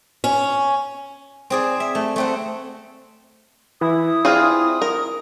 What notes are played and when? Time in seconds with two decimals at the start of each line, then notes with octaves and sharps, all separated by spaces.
0.24 C#4
1.50 C4 G#4 D5
1.80 E5
1.95 A3
2.16 A3 C4 F#5
3.81 E3 E4 D#6
4.25 C4 F4 G#4 D5 F6
4.82 A#4